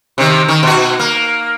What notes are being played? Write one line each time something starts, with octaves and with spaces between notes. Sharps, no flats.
C3 D#3
D#3
B2 F#4
A#3